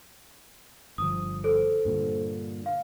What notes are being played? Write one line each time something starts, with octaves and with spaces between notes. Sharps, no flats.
G1 F3 D#6
A4 C5
G2 A#2 D3
F5